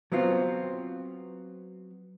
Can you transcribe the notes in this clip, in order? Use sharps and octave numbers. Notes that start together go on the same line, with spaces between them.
F#3 B3 C4 F4